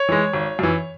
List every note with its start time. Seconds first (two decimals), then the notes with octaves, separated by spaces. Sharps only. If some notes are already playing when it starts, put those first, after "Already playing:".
Already playing: C#5
0.09 E3 G#3
0.33 G#1
0.59 F#2 E3